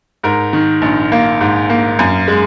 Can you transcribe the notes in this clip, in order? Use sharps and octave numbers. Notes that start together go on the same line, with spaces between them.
G#2 A#4
D#3
A#1
A#3
G#2
A#3
F#2
G#3